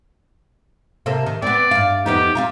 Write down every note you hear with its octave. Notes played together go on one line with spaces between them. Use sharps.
C3 A#3 A4
D#3
B3 C4 D5
G2 F5
F2 B3 D#4 G4
C4 F4 A#4